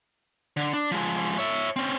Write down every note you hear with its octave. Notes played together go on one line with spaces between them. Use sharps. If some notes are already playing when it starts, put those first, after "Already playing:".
D3
D4
F3 G#3
C#5 E5
C4 C#4